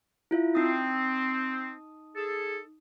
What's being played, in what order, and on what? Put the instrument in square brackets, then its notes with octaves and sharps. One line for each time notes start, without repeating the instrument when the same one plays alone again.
[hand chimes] E4 F4 E5
[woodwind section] C4 [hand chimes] D#4 D#6
[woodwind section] G#4 A4